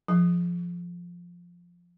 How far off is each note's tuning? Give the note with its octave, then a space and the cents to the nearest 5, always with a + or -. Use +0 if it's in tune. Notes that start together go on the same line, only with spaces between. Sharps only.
F3 +0 G#4 +0